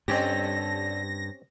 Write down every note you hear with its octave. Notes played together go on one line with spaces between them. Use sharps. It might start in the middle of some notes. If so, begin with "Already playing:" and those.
G2 D3 G3 C4 C#4 G4 A4 A#6